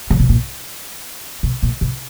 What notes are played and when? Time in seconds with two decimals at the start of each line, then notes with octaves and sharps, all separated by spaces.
0.10 C#3
0.20 B2
0.29 A#2
1.43 B2
1.63 A#2
1.81 B2